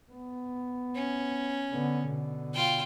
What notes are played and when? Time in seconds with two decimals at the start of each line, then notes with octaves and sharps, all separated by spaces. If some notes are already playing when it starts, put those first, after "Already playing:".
0.12 B3
0.95 C#4
1.72 D3 B3
2.07 B2 D3
2.54 F4 G5